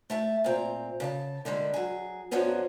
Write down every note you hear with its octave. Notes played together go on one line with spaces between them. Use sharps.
A3 E5 A5
A#2 C4 A#5
C#3 D5 A5
D3 G3 G#3 A#3
F#3 G#4
F#2 F3 F#3 B3 C#4 D4